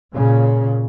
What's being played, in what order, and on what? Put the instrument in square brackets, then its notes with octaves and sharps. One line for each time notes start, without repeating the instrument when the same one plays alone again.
[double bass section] A#2 C#3